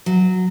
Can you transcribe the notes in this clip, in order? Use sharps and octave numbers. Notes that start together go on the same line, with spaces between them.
F#3